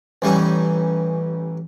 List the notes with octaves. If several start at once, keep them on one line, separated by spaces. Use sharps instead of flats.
A1 E3 G3 C#4 D#4